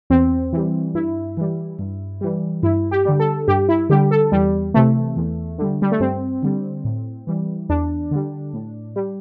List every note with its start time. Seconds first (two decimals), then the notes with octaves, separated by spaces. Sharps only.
0.10 E2 C4
0.53 E3 G3
0.94 G2 E4
1.37 E3 G3
1.79 G2
2.21 E3 G3
2.63 G2 E4
2.91 G4
3.05 D3 G3
3.20 A4
3.48 G2 G4
3.69 E4
3.90 D3 G3 G4
4.11 A4
4.32 E2 G3
4.74 C3 E3 A3
5.16 E2
5.58 D3 G3
5.82 G3
5.92 A3
6.00 G2 C4
6.43 D3 G3
6.84 A2
7.27 E3 G3
7.69 E2 D4
8.11 D3 G3
8.53 A2
8.96 G3